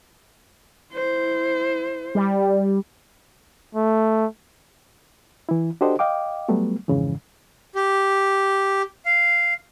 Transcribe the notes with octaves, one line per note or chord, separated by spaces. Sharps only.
E4 C5
G3
A3
E3 E4
D4 F#4 G4 A4 C5 D#5
D#5 F5 G5 D6
F#3 G3 A3 B3
F2 G#2 C#3 E3
G4
F5